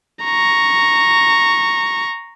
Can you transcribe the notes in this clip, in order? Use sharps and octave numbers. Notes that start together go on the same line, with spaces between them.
A#5 C#6